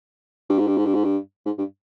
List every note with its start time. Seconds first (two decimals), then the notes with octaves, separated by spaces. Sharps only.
0.49 G2
0.59 G#2
0.67 G2
0.77 G#2
0.86 G2
0.94 G#2
1.04 G2
1.46 G#2
1.58 G2